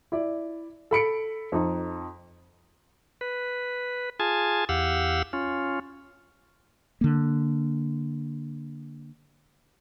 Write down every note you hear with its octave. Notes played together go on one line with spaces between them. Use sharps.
E4 D5
A4 B5 C#7 D7
F2 D#4
B4
F4 G#4 G#5 A5
E2 G4 F5 F#5 E6
C#4 F4
D3 A#3